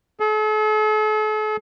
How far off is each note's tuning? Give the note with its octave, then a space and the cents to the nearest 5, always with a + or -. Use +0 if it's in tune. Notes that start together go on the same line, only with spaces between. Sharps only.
A4 -45